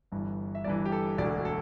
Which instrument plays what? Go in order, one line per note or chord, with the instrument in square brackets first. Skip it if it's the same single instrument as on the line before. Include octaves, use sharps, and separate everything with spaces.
[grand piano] G1 G2 E3
E5
G1 G2 E3 D5
G4
A4
E1 D2 D3 D5
A4